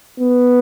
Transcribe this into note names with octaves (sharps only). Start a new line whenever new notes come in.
B3